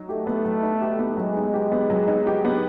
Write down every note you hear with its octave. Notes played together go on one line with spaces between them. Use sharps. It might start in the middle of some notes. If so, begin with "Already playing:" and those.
Already playing: F#3 D#4
A3 G4
B3
F#3
D#4
G4
B3
F#3 G#3
D#4
G4
B3
F#3
D#4
G4
B3